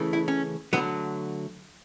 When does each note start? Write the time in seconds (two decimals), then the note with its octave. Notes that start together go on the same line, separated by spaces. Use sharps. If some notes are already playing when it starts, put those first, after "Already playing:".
Already playing: C#3 E3 A3
0.13 E4
0.28 C#4
0.73 D3 F#3 A3 B3